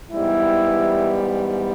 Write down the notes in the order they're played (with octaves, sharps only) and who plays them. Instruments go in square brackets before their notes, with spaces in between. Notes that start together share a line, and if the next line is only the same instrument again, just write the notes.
[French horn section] G#2 E3 G3 B3 [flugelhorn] E4